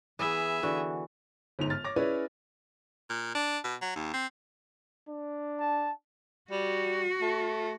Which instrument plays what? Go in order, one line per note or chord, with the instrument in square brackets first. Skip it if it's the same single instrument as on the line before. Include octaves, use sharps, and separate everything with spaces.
[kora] E3 B3 [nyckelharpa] G#4 E5
[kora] D3 E3 F#4
[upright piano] G1 G#2 F7
F6 A6
C#5 D6 A#6
C#4 E4 G#4 B4 C#5 D5
[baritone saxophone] A#2
D4
B2
F#3
D#2
C4
[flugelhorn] D4
[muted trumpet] A5
[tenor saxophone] G3 [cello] F#4
[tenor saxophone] A3